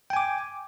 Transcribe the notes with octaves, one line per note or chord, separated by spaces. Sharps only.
G5 G#5 D6